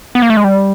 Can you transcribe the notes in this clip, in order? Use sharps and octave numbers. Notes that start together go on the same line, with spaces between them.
B3
A#3
A3
G#3
G3